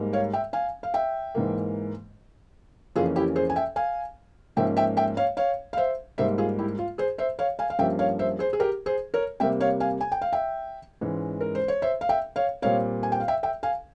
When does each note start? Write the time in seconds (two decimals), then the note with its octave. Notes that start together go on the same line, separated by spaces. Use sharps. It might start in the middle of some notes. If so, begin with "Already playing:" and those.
Already playing: G#2 G3 A#3
0.13 C#5 F5
0.33 E5 G5
0.53 F5 G#5
0.83 F5
0.94 E5 G5
1.35 G#2 E3 A#3
2.96 F2 C#3 E3 A#3 C#4 F4 G#4
3.16 E4 G4
3.36 G#4 C5
3.50 G#5
3.56 E5 G5
3.76 F5 G#5
4.56 G#2 F3 A#3 C#4 E5 G5
4.77 E5 G5
4.97 E5 G5
5.17 C#5 F5
5.37 C#5 F5
5.73 F5
5.77 C5 E5
6.18 G#2 G3 A#3 C5 E5
6.38 F4 G#4
6.59 E4 G4
6.79 F4
6.98 G#4 C5
7.18 C5 E5
7.39 C#5 F5
7.59 F5 G#5
7.70 F5
7.79 G2 F3 A#3 C#4 E5 G5
7.99 C#5 F5
8.19 C5 E5
8.39 G#4 C5
8.53 G#4
8.60 G4 A#4
8.86 G#4 C5
9.14 A#4 C#5
9.40 C3 G3 A#3 E5 G5
9.60 C#5 F5
9.80 F5 G#5
10.01 G#5
10.12 G5
10.22 F5
10.33 E5 G5
11.01 G#2 E3 G#3 C#4
11.41 A#4
11.55 C5
11.68 C#5
11.82 C5 E5
12.01 F5
12.09 E5 G5
12.36 C#5 F5
12.62 A#2 G3 C4 C#5 F5
13.03 G#5
13.12 G5
13.20 F5
13.28 E5 G5
13.43 E5 G5
13.63 F5 G#5